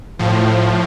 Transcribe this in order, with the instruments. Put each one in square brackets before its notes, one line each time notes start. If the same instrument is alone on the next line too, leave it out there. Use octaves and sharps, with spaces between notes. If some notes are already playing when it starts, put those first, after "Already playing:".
[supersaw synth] A2 F3